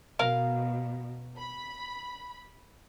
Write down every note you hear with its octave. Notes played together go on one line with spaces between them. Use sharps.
B2 A#4 F5
B5